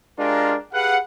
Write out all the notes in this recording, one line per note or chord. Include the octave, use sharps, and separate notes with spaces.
G#3 D4 F4 G4 A#4
G4 G#4 B4 F5 F#5